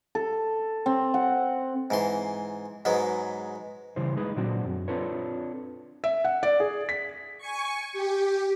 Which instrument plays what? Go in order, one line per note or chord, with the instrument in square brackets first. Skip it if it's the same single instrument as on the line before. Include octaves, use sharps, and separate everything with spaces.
[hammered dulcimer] A4
C4
F#5
[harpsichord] G#2 E3 C6
G#2 F#3 G#3 B3
[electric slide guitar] C#3 E3 G3 C5
G#3 D#4 G#4 B4
A#2 D3 F#3 C4 D4 F#4
F#2
C4 D4 F4 A4 B4 C#5
[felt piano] E5
F#5
D5
G#4
B6
[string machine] G#5 C#6
G4